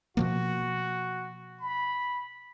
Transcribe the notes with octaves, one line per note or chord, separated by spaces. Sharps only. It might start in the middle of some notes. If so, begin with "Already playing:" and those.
B2 F3 A#3 F#4
B5